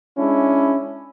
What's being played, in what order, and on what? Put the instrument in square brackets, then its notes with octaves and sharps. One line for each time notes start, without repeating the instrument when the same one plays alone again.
[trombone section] G#3 C#4 D4 E4